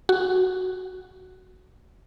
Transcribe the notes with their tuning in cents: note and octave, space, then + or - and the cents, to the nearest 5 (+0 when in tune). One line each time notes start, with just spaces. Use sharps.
F#4 +5